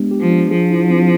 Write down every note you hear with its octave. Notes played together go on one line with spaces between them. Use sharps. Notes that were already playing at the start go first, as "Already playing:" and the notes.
Already playing: G#3 B3 D4 G4
G4
F3
D4
F3 G#4
E4
C4